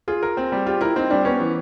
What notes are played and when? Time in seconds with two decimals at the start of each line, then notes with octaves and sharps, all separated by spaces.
0.08 F4 G#4
0.23 A#4
0.37 C4
0.52 G3
0.66 F4 G4
0.81 E4 A#4
0.96 C4 D#4
1.10 G3 D4
1.25 B3 C#4
1.40 E3